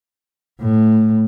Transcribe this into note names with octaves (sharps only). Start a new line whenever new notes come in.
A2